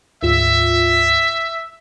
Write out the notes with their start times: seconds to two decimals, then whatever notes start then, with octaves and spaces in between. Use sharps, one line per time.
0.23 D2 G#2 F4 E5